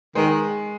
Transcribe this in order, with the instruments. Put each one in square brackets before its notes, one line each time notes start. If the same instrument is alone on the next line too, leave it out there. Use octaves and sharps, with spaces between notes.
[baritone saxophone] D#3 [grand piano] G#3